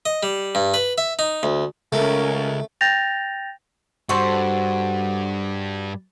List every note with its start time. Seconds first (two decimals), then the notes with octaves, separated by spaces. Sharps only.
0.06 D#5
0.23 G3
0.55 G2
0.74 B4
0.98 E5
1.19 D#4
1.43 D2
1.93 C#2 A3 C#4 A#4
2.81 G5 G6 A6 A#6 F7
4.09 G2 G3 F#4 A4 C5